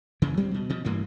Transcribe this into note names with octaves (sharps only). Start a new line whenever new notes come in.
D#2 C#3 E3
F#3 G#3 C4
B2
B2 F3
A1 G2 E3 A#3